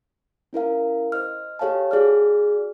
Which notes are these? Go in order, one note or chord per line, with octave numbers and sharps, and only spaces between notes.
C#4 E4 A#4 F5
C5 D#5 F6
G4 A4 C#5 F5 G#5 A5
F#4 G#4 D5 F6